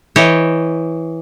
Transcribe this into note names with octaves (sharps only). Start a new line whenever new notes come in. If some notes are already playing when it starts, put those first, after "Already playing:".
E3 C#5 D#5 G5